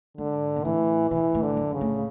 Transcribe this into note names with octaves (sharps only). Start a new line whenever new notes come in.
G#2 D3
B2
A2 E3
B2 E3
A2
D3
F#2
C#3
A2